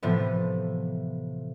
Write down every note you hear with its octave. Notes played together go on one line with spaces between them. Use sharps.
A2 C3 E3 F3 A3 B3